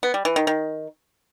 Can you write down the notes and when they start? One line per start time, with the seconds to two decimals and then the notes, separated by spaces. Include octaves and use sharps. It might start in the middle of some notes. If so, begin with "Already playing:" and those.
0.03 B3
0.14 G3
0.25 E3
0.36 D#3
0.47 D#3